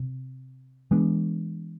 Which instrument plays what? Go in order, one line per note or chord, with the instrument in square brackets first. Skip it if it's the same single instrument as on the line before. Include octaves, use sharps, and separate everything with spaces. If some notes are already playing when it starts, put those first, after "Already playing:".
Already playing: [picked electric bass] C3
E3 G#3 B3 D4